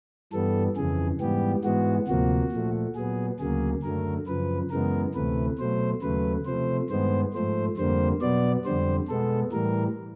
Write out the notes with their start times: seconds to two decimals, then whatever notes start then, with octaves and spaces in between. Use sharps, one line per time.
0.33 G2 E3 G3 B3 A4
0.77 F2 C#3 E3 G#4
1.20 G#2 E3 G3 B3 G4
1.64 G#2 E3 G#3 B3 F#4
2.08 D2 C3 F3 A#3 F#4
2.52 A#2 F3 A3
2.95 A#2 F#3 B3 G#4
3.39 D2 C#3 F#3 A#3 G#4
3.83 F#2 D3 F#3 A3 A#4
4.27 F#2 C#3 F3 B4
4.71 F#2 C#3 E3 G#3 B3 A#4
5.15 D2 C3 E3 A3 B4
5.59 B2 F#3 A3 C5
6.02 D#2 C#3 F#3 A3 B4
6.46 C3 F3 A3 C5
6.90 G2 D#3 G#3 B3 C5
7.34 G#2 F3 A3 C5
7.77 F2 D3 G3 A#3 C5
8.21 B2 F#3 B3 D5
8.65 F2 D3 G3 C5
9.08 B2 G#3 B3 A4
9.52 A2 E3 G3 A#4